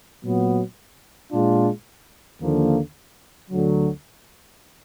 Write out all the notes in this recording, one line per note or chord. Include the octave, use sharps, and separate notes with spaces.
A#2 F#3 B3
A#2 G#3 D4 F4
D#2 D3 F3 A#3
D2 D3 F#3